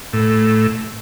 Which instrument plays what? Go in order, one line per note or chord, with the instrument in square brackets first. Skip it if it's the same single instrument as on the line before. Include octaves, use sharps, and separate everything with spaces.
[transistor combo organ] A2